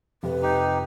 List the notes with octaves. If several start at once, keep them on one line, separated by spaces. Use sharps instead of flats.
F2 C3 B4
D#4 G4